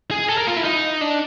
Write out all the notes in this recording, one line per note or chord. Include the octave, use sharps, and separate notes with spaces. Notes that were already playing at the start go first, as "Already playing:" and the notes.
G#4
A4
A#4
F4
E4
D#4
D4